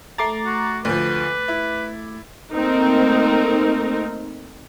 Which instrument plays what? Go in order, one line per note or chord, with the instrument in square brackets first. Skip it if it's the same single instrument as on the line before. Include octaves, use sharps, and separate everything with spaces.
[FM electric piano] A3 D6 A6 [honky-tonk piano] A#5 C7
[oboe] F#4
[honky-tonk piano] D2 F3 [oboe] B4
[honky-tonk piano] E4
[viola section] A3 A#3 C4 D#4 A#4